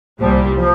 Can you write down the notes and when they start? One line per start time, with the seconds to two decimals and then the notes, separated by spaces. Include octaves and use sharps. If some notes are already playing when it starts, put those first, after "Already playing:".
0.21 C2 A#2 F3 G3
0.58 F3